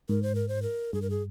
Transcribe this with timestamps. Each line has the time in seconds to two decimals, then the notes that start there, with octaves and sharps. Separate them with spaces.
0.09 G#2 A#4
0.23 C5
0.35 A#4
0.49 C5
0.62 A#4
0.93 G2 G#4
1.02 A#4
1.10 G#4